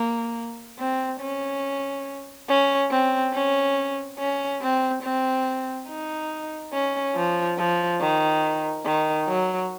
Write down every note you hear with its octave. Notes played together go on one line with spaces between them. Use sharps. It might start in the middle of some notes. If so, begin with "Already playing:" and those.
Already playing: A#3
C4
C#4
C#4
C4
C#4
C#4
C4
C4
D#4
C#4
F3
F3
D#3
D#3
F#3